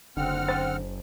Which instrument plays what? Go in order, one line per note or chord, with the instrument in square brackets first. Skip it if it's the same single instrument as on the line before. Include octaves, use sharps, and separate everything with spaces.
[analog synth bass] F#1 [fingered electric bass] D3 [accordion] C4 F#5 F6
[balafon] C5